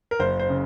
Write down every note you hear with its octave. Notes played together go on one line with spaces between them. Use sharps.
A#4
F#1 C5
C5
C#3